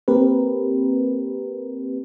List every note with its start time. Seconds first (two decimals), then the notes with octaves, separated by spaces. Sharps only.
0.08 A#3 C4 G4 A#4 B4